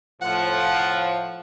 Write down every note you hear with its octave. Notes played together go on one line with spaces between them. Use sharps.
A2 F3 F#5